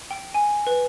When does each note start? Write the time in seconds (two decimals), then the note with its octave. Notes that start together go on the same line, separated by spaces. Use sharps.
0.11 G5
0.34 G#5
0.67 B4